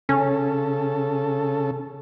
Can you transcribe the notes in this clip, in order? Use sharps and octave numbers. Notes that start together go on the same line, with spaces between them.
C#3 C#4 A4